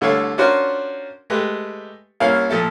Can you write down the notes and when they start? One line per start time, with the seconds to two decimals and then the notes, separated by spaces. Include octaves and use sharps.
0.01 C2 D3 A3 C#5 F5 E6
0.38 C#4 D4 F4 F#4 A#4 C5
1.30 G#3 A3 G4 B4
2.20 C2 A#3 C#4 E4 F5
2.50 A#2 F3 A4 E5